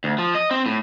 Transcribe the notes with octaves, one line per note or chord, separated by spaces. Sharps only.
D2
F3
D#5
C4
A2